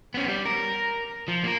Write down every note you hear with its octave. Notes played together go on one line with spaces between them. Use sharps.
B3 C#4
G3
A#4
F3
A#3 A#4